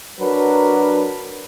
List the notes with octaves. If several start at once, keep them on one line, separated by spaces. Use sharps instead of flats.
F#3 D4 A#4 B4